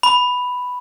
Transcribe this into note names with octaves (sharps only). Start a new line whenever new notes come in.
B5